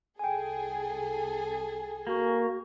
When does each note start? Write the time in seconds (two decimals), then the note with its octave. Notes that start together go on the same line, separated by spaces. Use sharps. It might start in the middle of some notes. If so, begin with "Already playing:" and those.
0.19 C2 G#4 A4 G5 G#5
2.07 A#3 F#4